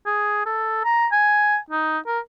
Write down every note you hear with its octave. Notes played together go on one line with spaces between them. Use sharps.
G#4
A4
A#5
G#5
D#4
A#4